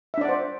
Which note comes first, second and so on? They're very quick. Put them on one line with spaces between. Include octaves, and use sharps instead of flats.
E5 D4 D5 F#5 C5